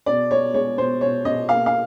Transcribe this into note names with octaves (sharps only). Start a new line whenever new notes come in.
B2 D5
B3 C#5
G#3 C#5
B2 C5
B2 C#5
B2 D#5
A#3 F5
F5